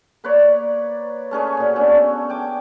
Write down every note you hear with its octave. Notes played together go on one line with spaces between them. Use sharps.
A#3 B4 C#5 D5
A3 C#4 G#4 B4
A#2 F#4
A3 B3 C#4 D4
G5 G#5 D6